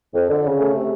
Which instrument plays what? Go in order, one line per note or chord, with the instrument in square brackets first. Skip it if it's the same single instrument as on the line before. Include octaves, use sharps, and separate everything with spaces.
[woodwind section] F2
D3
C#3
A3
C3